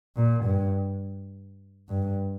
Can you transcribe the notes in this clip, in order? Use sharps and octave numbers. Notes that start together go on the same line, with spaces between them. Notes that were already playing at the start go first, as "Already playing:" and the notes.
A#2
G2
G2